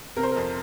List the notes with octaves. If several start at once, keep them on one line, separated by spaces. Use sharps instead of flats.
C3 A#4
C5
F2 A#4